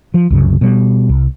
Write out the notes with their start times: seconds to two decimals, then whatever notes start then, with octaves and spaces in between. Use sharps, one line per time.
0.14 F3
0.30 C2 F#2 C#3
0.61 B2 G3
1.09 C2